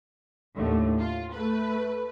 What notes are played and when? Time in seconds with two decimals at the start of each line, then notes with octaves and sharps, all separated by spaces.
0.56 D#2 A2 D3 A3
1.00 F4
1.32 A3 B4